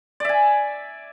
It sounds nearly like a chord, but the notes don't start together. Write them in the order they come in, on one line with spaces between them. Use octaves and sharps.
D5 E5 G#5